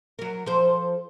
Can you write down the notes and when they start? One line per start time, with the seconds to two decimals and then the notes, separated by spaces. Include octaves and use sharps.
0.19 F#3 A#4
0.46 F3 A4 C5